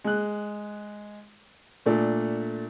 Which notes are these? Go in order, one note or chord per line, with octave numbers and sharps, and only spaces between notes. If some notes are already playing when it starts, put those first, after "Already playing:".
G#3 F#6
A#2 A3 D4